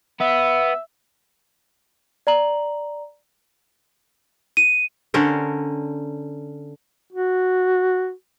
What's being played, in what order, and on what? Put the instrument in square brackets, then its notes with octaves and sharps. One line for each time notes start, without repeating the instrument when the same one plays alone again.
[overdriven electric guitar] B3 [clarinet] E5
[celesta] D5 A#5 F#7
D#7
[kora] D3 C#4 A#4 C5
[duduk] F#4